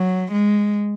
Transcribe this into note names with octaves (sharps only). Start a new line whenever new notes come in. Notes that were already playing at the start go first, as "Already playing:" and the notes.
Already playing: F#3
G#3